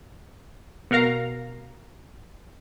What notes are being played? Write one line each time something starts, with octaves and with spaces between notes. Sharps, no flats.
B2 F#4 A#4 F5 A#5